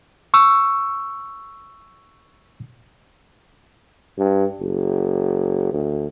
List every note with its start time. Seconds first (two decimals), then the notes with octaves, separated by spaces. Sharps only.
0.34 C#6 E6
4.18 G2
4.61 F#1
5.73 D2